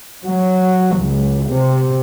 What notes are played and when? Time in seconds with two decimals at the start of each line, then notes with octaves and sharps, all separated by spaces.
0.22 F#3
0.95 C#2
1.47 C3